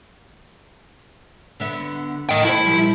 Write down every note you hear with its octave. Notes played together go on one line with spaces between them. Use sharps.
D3 B3 E5
A2 D#5 G5
A3 E4 C5
A#2 F3 G3